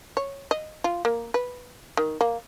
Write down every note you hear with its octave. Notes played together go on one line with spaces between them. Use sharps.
C#5
D#5
F4
A#3
B4
D#3
A#3